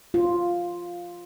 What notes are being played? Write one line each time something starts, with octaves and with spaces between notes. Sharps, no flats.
F4